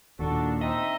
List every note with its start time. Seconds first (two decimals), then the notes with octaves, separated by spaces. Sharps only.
0.19 D#2 A#2 D4 F#4 A4
0.61 C4 D#4 D#5 E5